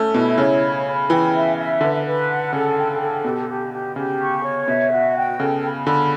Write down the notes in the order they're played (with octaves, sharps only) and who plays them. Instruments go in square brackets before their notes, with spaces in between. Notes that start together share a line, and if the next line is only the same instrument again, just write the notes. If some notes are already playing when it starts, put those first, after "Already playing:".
Already playing: [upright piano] A3 C#4
[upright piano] B2 [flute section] E4
[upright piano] C#3 [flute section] C#5
[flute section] B5
B5
[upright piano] E3 [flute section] G5
[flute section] E5
E5
[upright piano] D3 [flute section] B4
[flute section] B4
F#5
[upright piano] C#3 [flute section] A4
[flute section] G5
A4
[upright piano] B2 [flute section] G4
[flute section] G4
G4
[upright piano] C#3 [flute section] G4
[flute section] C#6
C#5
[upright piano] B2 [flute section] E5
[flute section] F#4
G5
[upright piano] C#3 [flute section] A4
[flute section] B5
[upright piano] D3 [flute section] B5